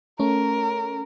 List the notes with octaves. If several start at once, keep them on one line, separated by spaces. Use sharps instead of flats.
A3 C#4 A#4